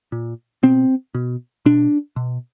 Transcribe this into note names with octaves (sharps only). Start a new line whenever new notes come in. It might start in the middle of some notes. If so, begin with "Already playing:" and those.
A#2
B2 C4
B2
B2 D4
B2